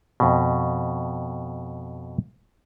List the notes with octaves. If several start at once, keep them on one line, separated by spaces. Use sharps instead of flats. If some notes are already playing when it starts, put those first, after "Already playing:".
F2 B2